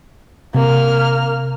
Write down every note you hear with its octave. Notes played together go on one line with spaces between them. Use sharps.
C3 A#3 F6